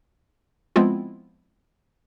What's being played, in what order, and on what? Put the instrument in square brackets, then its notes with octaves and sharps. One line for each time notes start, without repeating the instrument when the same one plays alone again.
[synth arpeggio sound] F3 G#3 B3 C4 E4 F4